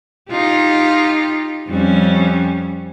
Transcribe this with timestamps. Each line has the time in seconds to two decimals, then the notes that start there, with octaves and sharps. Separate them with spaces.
0.31 D#4 F4 G4
1.68 F2 G3 C#4